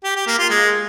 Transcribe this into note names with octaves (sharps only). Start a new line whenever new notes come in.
G4
G4
A#3
F4
G#3